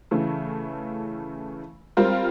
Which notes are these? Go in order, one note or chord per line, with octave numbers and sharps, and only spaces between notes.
C#3 E3 A3
G3 C4 F4 A#4